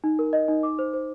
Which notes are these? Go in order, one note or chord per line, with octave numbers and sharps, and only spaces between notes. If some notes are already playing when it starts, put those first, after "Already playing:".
D#4
A#4
D#5
D#4
D6
C5
C5